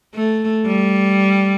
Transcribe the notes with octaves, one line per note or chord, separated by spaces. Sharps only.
A3
G3